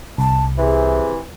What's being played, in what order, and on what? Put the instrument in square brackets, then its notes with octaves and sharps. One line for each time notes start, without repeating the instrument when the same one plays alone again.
[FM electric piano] C2 [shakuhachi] A5
[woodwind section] C3 E3 [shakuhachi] G#4